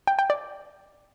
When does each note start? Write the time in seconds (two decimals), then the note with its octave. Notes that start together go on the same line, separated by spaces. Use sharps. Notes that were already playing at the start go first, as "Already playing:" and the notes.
0.07 G5
0.19 G5
0.30 D5